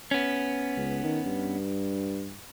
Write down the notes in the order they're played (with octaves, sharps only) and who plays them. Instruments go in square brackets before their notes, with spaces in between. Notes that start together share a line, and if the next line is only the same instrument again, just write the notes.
[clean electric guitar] B3 C#4
[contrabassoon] C#2
D#3
G2